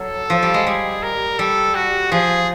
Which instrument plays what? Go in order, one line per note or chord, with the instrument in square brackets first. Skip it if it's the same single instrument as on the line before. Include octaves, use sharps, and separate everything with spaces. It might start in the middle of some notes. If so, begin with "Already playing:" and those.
Already playing: [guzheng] F#3 [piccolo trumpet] A4
[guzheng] F3
G3
G#3
[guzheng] G3 [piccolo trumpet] G#4
[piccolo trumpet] A#4
[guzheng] G3 [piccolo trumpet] A4
[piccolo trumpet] F#4
[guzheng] F3 [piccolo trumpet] G#4